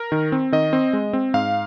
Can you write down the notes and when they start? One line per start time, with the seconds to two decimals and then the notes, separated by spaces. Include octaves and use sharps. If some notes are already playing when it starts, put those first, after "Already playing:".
Already playing: A#4
0.12 D#3
0.32 C4
0.52 D#3 D#5
0.73 C4
0.93 G#3
1.13 C4
1.34 G#2 F5